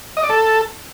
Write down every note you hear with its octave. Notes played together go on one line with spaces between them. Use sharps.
D#5
D5
A4